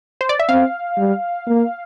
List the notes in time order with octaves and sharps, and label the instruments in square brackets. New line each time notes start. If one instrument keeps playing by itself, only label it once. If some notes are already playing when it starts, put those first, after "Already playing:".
[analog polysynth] C5
D5
E5
[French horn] C4 [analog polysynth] F5
[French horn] G3
A#3